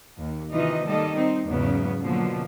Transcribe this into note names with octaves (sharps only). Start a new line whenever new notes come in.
D#2
C3 D#3 E3 D#4 F4 D#5
D#3 G3 A#3 A4 D#5
C4 D#4
E2 G#2 C#3 F#3 B3
B2 D3 F3 F#3 A#3